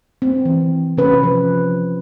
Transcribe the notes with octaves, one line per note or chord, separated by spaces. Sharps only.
C4
E3
C3 C#4 B4
F3